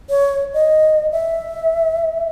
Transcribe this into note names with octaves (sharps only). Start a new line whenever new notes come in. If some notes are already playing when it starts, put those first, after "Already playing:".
C#5
D#5
E5